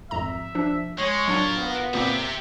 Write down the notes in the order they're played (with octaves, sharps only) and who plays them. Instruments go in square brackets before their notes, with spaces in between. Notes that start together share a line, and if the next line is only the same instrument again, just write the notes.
[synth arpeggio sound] G#1 F2 A#5 [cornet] E5
[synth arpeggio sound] F3 D4
[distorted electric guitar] G#3 [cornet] C#5
[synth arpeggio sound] F#3 D4 [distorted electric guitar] F4 A#4
[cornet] B3
[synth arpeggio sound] A#2 A#3 C4 [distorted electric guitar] G4 E5